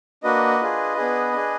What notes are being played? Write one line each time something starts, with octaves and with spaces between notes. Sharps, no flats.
A#3 D4 F#4 B4 D#5
D4 F4 G#4
B3 D4 G#4
D4 G#4